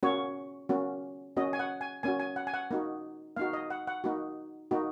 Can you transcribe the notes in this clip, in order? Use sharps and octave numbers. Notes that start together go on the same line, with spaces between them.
A#3 C#4 F#4 C#5
A#3 C#4 F#4
A#3 C#4 F#4 D#5
G#5
F#5
G#5
A#3 C#4 F#4 G#5
G#5
F#5
G#5
F#5
A#3 D#4 F#4
A#3 D#4 F#4 F5
D#5
F#5
F#5
A#3 D#4 F#4
A#3 D#4 F#4